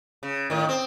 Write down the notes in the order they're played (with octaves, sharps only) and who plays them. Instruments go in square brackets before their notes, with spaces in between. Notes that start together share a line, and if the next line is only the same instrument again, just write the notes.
[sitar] C#3
A2 D#3
C4